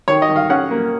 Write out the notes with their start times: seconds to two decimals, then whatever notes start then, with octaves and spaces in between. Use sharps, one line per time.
0.08 D#3 C#5
0.22 D#5
0.29 D#3
0.36 F5
0.50 C#4 F#5
0.71 A#3